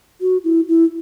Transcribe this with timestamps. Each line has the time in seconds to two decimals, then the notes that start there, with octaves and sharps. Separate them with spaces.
0.21 F#4
0.44 E4
0.68 E4